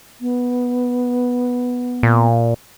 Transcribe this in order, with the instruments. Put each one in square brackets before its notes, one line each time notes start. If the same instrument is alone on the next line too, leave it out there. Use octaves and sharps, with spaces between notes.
[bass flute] B3
[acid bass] A#2